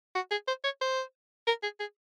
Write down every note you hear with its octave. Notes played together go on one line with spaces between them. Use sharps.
F#4
G#4
C5
C#5
C5
A#4
G#4
G#4